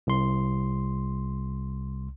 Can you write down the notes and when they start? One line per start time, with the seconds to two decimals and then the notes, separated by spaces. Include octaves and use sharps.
0.07 C2 C6